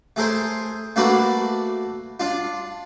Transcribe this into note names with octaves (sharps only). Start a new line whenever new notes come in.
A3 G#4 A#4 C5
A3 A#3 D4 F#4 A#4 B4
D4 F4